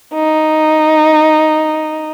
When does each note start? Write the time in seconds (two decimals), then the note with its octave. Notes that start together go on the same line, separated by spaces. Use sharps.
0.14 D#4